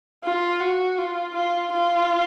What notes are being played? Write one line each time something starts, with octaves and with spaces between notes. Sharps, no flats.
F4
F#4
F4
F4
F4